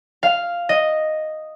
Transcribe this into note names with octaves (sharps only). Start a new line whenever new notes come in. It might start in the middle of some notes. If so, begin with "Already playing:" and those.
F5
D#5